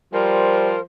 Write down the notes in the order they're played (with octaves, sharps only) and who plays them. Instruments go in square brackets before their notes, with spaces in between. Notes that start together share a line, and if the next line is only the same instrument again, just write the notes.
[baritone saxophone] F3 [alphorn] G3 [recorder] A#4 [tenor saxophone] C5